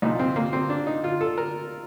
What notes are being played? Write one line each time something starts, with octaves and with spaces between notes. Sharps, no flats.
C2 A#2 F3 D#4
C4
A#3
C4
D4
D#4
F4
A4
A#4